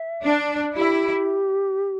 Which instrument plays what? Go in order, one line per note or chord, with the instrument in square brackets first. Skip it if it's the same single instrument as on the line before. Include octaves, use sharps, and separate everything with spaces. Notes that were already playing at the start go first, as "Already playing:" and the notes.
Already playing: [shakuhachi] E5
[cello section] D4
[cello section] E4 [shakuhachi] G4